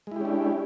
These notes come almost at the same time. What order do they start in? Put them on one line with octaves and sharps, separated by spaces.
G#3 E4 G4 C#4 D4